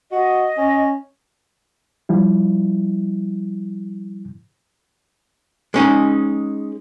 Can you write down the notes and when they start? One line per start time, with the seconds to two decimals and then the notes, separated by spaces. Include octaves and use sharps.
0.12 F#4 D#5
0.57 C#4
2.09 F3 G3 E4
5.74 G#3 C#4 D#4